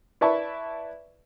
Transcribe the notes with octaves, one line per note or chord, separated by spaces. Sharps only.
E4 B4 D5 E5 A5 C#6